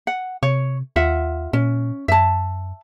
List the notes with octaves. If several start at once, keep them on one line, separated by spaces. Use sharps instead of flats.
F#5
C3 C#5
D#2 F4 E5 F#5
A#2 C#4
F#2 E5 A5